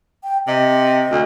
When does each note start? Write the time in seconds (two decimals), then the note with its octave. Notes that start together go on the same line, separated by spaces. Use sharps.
0.24 G5
0.47 C3 D#5
1.11 D2